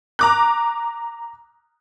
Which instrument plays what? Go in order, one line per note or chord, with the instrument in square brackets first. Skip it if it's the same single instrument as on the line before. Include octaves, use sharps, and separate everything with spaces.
[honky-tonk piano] A#5 D6 F#6